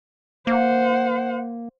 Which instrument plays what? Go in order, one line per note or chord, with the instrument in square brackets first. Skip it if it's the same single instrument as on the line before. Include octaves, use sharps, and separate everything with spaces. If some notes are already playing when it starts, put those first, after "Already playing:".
[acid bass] A#3 [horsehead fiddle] C5 F#5